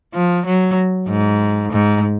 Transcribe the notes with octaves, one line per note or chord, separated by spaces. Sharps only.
F3
F#3
G#2
G#2